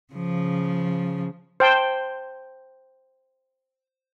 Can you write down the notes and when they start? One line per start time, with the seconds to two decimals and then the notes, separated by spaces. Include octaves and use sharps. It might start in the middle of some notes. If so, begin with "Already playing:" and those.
0.13 C#3 F3
1.60 C5 G5 A5